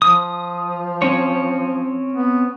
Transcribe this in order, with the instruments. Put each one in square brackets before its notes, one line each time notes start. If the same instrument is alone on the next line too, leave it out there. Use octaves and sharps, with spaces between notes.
[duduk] F3 [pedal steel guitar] D#6
[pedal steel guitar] C4 C#4 C#5
[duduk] B3